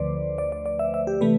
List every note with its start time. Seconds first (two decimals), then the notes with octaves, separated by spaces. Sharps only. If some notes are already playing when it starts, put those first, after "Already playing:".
Already playing: D2 D3 F3 A3 B4 C5 D5
0.38 D5
0.52 D5
0.66 D5
0.79 E5
0.94 E5
1.07 G4
1.21 C3 E3 A3 B4